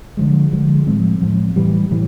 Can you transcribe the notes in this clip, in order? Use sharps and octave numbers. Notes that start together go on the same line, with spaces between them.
D3 F3 G#3
D3 F3 G#3
A2 F3 G#3 C4
A2 F3 G#3 C4
A2 E3 G3
A2 E3 G3